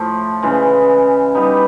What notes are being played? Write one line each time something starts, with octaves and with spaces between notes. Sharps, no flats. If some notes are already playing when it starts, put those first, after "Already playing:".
Already playing: A2 F3 A3
C#3 E3 G#3
G3 B3 D#4